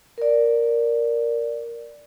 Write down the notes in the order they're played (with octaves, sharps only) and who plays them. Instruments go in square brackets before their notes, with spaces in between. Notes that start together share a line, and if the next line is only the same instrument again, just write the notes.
[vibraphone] A#4 D5